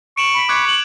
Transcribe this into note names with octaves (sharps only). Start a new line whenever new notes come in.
C#6 D7 E7 F#7
B5
C#6 D6 F#6 G#6
F#7